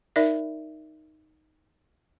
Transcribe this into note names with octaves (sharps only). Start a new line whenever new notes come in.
D#4 A#4 D5 E5